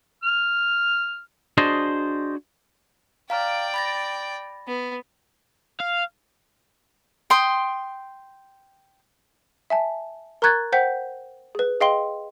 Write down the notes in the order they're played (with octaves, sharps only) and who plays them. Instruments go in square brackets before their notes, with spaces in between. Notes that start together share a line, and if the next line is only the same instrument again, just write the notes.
[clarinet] F6
[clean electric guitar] D4 F#4 G#4 C5 D5 D#5
[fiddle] D5 G5 [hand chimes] F5 A#5 F6
[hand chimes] B5 A6 A#6
[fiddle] B3
[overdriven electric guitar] F5
[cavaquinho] G5 C6 D#6
[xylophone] E5 G#5 A5
A#4 A#5 C#6 F#6 G#6 A6
C5 F#5 G5 G6 B6
G#4 B4
G#4 D#5 F5 G5 C6 G7